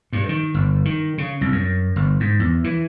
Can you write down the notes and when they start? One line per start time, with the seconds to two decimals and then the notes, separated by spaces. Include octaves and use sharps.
0.13 G2
0.29 D#3
0.54 G1
0.85 D#3
1.18 C#3
1.41 C2
1.52 F#2
1.96 G1
2.20 G#2
2.40 E2
2.64 E3